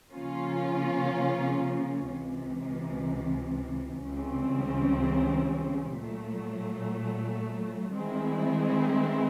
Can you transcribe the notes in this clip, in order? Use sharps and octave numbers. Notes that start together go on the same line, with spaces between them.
C#3 F3 A#3 C#4 F4
C#2 C3 E3
C#2 C#3 E3 G3 C4
A#2 F#3 A3
D#3 G#3 C4 E4 G#4